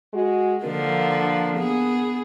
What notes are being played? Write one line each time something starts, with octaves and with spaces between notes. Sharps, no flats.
G#3 F#4
D3 F3 A#3 D4 A#4
B3 G#4